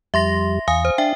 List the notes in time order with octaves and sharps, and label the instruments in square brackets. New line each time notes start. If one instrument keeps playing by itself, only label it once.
[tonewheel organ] F2 G3 [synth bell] E5 C6 A#6
[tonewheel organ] E2 [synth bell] F5 G#5 D#6
[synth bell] C5
[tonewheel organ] D4 [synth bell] E5 G5